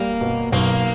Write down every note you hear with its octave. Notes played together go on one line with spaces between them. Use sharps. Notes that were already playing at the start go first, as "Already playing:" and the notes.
Already playing: G3 A#3
B2
B1 A#3